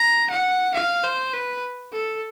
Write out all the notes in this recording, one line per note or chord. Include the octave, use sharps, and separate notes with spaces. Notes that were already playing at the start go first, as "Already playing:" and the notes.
Already playing: A#5
F#5
F5
C5
B4
A4